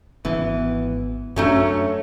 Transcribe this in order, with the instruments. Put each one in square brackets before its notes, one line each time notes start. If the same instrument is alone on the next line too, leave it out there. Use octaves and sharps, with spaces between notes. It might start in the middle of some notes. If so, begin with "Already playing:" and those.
[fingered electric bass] G#1 B3 [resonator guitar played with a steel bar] E3
[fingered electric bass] F#2 D4 [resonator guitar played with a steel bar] F#3 A3 C#4